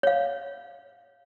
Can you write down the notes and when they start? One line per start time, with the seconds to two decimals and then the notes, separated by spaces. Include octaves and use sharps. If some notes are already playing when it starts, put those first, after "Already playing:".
0.03 C#5 F5